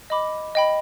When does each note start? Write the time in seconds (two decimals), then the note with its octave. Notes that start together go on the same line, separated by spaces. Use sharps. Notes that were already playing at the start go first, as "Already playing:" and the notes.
0.10 D#5 B5 D6
0.55 D#5 G5 B5